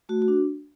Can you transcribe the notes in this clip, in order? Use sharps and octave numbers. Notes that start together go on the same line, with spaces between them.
A3 F#4
F#4
D4